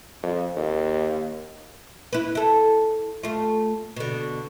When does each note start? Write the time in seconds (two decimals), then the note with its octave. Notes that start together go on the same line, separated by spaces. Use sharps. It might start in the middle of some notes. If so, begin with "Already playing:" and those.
0.23 F2
0.57 D#2
2.13 E4 B4
2.35 E4 A4
3.23 A3 F4
3.96 B2 D3